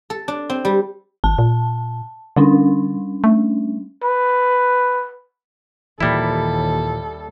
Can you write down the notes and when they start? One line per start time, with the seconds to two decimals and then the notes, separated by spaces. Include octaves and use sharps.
0.10 A4
0.28 D4
0.50 C4
0.65 G3
1.24 G#1 A5
1.38 A#2
2.37 D3 G3 C#4 D4
3.24 A3
4.03 B4
6.01 D#2 A#2 E3 G3 E4 A4